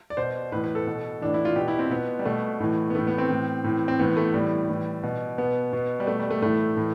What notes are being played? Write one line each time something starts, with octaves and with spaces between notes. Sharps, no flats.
D5
B2 C5
A2 E3 B4
B4
A4
B2
A2 E3 D4
E4
F4
B2 G4
E4
C4
B2 B3
G3
B2 A3
A2 E3
B3
A2 E3 A3
B3
C4
A2 E3
A2 E3
C4
A2 E3 B3
A3
A2 E3 G3
A2 E3
B2
B2 B3
B2
G3
B2 A3
G3
A3
A2 E3 A3
A2 E3